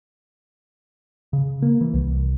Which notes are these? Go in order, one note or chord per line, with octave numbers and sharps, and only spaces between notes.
C#3
A#3
E3
C2